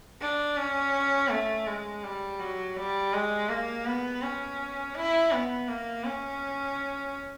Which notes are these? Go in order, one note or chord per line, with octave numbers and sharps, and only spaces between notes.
D4
C#4
A3
G#3
G3
F#3
G3
G#3
A#3
B3
C#4
E4
B3
A#3
C#4